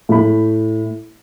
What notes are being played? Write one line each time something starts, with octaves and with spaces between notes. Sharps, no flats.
A2 E4 B5